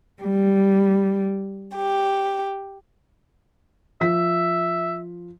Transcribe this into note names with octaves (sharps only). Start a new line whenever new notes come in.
G3
G4
F3 E5 B6